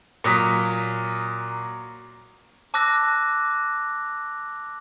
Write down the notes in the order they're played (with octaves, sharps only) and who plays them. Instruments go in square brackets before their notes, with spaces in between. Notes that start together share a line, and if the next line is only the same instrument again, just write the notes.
[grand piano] A#2 F#3 D#6 B6
[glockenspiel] A5 D6 E6 F#6 A#6